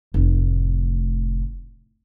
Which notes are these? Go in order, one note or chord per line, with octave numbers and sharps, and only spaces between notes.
F1 A2